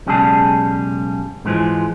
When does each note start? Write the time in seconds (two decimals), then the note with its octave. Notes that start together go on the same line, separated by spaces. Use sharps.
0.06 B1 C#3 G3 G#3 G#4 A5
1.45 G#2 D3 E3 F3 G#3